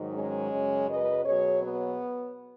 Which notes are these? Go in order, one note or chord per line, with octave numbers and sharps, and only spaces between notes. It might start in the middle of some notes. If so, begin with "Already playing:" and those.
Already playing: G#2 D#3 F#3
G#3 C#4
F#2 C#3 F#3
B4 D#5
B2 F#3 G#4 C#5
B3